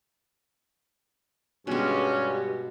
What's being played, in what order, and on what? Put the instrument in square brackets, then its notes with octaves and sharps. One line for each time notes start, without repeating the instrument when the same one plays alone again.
[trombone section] G2 [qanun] B2 G#3 [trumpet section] C#4 [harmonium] G4